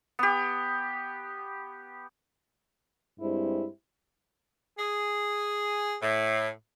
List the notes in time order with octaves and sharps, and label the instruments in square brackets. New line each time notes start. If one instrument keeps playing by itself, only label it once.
[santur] B3 G4
[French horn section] G2 G#3 C4 E4 G4 C5
[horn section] G#4
A2